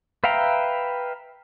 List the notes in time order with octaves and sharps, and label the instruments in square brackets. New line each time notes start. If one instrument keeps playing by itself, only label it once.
[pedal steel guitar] B4 E5 F5 G5 A#5